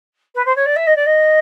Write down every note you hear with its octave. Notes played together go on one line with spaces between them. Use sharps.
B4
C5
C#5
D5
E5
D#5
D5
D#5